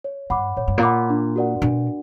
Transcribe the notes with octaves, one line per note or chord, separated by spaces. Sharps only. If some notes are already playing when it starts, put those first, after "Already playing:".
C#5
G2 F#5 B5 D6
A#2 C#5
G2
A#2
F#5 B5 D6
D4
F#4 A#4 D5 F#5
B2 D4